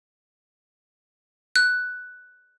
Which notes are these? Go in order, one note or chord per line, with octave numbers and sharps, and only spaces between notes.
F#6